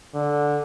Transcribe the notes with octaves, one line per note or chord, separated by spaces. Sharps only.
D3